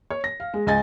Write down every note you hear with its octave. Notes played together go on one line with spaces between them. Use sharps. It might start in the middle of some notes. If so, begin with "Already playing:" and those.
C#5
A#6
F5
G#3
C#2 D#5 G#5 A6